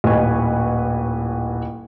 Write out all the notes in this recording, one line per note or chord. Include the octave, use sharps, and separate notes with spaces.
D#1 A1 B4 G#5 C#6